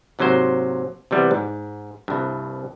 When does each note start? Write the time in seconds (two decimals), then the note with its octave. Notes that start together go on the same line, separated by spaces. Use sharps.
0.19 G#2 C3 F#3 A#3 C5
1.11 C3 E3 G3 B3
1.31 G#2
2.08 C2 G2